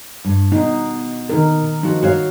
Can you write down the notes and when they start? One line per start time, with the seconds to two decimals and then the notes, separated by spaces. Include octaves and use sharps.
0.25 G2
0.52 B2 D#4
1.30 D#3 D#4 A#4
1.83 F3 D#4 F#4
2.03 F#4 C#5 F5